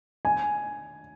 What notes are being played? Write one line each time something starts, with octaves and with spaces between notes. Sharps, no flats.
G#5